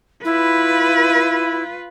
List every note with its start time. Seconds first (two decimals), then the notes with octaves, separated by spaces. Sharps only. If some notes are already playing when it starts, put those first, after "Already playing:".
0.25 E4 F4 B4